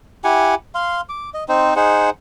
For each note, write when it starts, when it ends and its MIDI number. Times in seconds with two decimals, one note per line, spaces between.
0.24 0.55 64
0.24 0.55 67
0.24 0.55 78
0.24 0.55 80
0.75 1.01 77
0.75 1.01 84
1.09 1.30 86
1.34 1.44 75
1.49 1.74 60
1.49 1.74 63
1.49 1.74 72
1.76 2.10 63
1.76 2.10 68
1.76 2.10 72
1.76 2.10 78